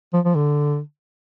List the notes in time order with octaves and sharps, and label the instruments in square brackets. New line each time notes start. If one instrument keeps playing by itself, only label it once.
[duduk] F3
F3
D3